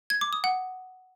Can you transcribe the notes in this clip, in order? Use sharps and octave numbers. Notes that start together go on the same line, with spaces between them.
G#6
D6
D#6
F#5